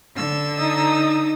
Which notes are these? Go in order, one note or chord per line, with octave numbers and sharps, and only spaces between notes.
D3 E6
D#4 D#6